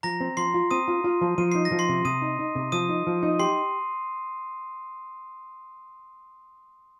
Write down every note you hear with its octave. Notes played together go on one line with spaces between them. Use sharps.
F3 A#5 A#6
C4
F3 C6 C7
F4
C4 D#6 D#7
F4
F4
F3
F3 D#7
D#4 C7
A#6
F3
C6 C7
C3
C3 D#6 D#7
D#4
D#4
C3
F3 D#6 D#7
D#4
F3
D#4
G4 C6 C7